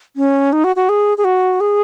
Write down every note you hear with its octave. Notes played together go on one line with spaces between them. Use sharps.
C#4
D#4
F#4
F#4
G#4
G#4
F#4
G#4